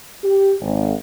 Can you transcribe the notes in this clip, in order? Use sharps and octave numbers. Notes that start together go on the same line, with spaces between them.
G4
G#1